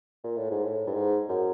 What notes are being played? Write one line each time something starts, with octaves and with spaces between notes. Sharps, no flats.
A#2
A2
G#2
A2
G2
G#2
F#2